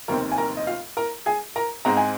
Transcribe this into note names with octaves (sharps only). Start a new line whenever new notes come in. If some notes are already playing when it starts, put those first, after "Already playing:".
F1 D#2 D#3 C4 A#4 A#5
G#5
A#4 A#5
D#5
F4 F5
A#4 A#5
G#4 G#5
A#4 A#5
G#2 G#3 C4 A#5
G#5